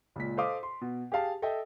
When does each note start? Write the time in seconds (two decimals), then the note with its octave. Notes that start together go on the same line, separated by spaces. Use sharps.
0.16 C#2 A#2 B6
0.37 A4 C5 D#5 F5 D6 D#6
0.63 C6
0.81 B2
1.12 G4 G#4 F5 A5
1.42 A4 D#5 E5 G5